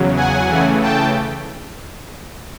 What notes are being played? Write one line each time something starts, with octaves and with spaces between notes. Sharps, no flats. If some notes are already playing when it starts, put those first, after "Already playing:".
Already playing: E2 C#3 F#3
F#5 G#5
C#3 E3 A3
G5 A5